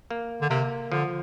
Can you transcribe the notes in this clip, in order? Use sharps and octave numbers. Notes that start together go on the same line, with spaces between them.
A#3
D3
C3 A#3
D3 F3